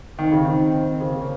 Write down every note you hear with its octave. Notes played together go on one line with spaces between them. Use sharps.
D#3 C4
C#3
D#3
C#3 A#3
C#4